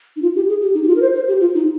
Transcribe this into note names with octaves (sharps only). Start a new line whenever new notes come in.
D#4
F4
G4
G#4
G4
D#4
G4
F4
A#4
C5
C5
G4
F4
D#4